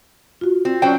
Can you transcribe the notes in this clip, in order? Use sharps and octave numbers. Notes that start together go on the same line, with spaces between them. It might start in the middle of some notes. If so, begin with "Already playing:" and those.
F4 F#4
C4
F#3 C#4 C5 D5 G5